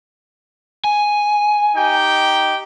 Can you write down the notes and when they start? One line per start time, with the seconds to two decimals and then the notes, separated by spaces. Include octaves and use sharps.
0.84 G#5
1.76 D#4 G4 G5